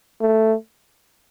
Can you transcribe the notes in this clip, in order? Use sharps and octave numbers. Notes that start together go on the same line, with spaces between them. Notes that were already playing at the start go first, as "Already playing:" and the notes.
A3